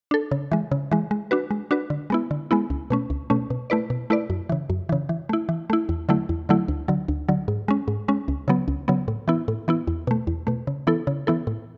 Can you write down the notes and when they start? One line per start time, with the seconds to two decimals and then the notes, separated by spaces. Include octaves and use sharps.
0.11 D4 A4
0.31 C#3
0.52 E3 G#3
0.71 C#3
0.91 E3 G#3
1.11 G#3
1.31 D4 F#4 B4
1.51 G#3
1.71 D4 F#4 B4
1.90 D3
2.10 G#3 B3 E4
2.31 D3
2.51 G#3 B3 E4
2.70 C#2
2.90 B2 A3 C#4
3.10 C#2
3.30 B2 A3 C#4
3.50 B2
3.70 A3 E4 B4 D5
3.90 B2
4.10 A3 E4 B4 D5
4.30 F#2
4.49 C#3 E3
4.70 F#2
4.89 C#3 E3
5.09 E3
5.29 A3 E4
5.49 E3
5.70 A3 E4
5.89 E2
6.09 D3 F#3 A3 E4
6.29 E2
6.49 D3 F#3 A3 E4
6.68 D2
6.88 D3 F#3
7.08 D2
7.28 D3 F#3
7.48 G#2
7.68 G#3 C#4
7.88 G#2
8.08 G#3 C#4
8.28 C#2
8.48 C#3 F#3 B3
8.68 C#2
8.88 C#3 F#3 B3
9.08 A2
9.28 E3 B3 E4
9.48 A2
9.68 E3 B3 E4
9.87 E2
10.07 B2 A3
10.27 E2
10.47 B2 A3
10.67 C#3
10.87 E3 B3 E4 A4
11.07 C#3
11.27 E3 B3 E4 A4
11.47 A2